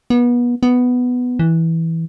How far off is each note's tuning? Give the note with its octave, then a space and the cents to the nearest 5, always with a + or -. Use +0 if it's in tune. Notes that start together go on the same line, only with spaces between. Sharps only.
B3 -30
B3 +5
E3 -10